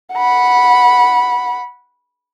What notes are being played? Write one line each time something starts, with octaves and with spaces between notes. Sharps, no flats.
F#5 B5